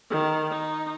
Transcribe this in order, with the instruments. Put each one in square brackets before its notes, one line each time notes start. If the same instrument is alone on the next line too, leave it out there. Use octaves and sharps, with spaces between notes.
[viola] D#3
D#4